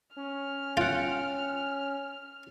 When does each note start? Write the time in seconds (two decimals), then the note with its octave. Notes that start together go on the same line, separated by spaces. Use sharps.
0.16 C#4 F6
0.77 F4 F#5 G5